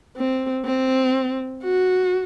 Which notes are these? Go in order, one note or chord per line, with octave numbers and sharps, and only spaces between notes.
C4
C4
F#4